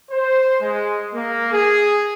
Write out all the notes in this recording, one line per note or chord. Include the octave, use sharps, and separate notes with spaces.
C5
G#3
A#3
G#4